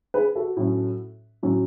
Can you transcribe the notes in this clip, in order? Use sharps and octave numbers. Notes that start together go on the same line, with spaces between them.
G#4 B4
F#4 A4
A2 F#3 C#4
A2 F#3 C#4